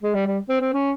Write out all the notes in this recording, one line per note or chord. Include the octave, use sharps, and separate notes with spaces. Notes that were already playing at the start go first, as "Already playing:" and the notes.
G#3
G3
G3
C4
C4
C#4